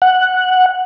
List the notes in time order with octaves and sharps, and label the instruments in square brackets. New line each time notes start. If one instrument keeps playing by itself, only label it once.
[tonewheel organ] F#5